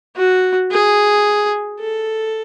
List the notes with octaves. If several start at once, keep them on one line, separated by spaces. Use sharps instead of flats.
F#4
G#4
A4